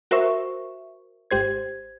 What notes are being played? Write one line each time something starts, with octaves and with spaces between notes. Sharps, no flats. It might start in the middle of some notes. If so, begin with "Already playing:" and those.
F#4 A#4 C5 E5 C#6
G#1 G4 C5 G#6